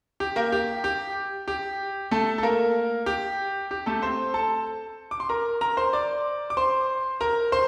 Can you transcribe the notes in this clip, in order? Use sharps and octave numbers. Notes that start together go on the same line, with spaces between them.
G4
A#3 A#4
G4
G4
G4
A3 A4
A4
A#3 A#4
G4
G4
A3 A4
C4 C5
A4 A5
D6
C6
A#4 A#5
A#4 A#5
C5 C6
D5 D6
D6
C5 C6
A#4 A#5
C5 C6